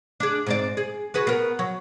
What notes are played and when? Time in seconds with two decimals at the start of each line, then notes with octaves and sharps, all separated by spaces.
0.20 D4 G#4
0.46 G#2 C4 D5
0.77 G#4
1.14 F#4 G#4 B4
1.27 B3 A#4
1.59 F#3